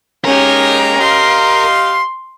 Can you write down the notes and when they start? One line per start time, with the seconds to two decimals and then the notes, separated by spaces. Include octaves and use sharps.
0.25 G#3 A#3 C#4 D#4 G4 A#4
1.00 G4 D#5 F5 C6